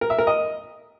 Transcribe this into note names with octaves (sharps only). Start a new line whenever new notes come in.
A#4
E5
A#4
D#5